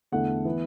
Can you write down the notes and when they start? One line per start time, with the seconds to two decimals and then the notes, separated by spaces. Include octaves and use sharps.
0.12 E2 D3 A3 F#5
0.45 E3 B3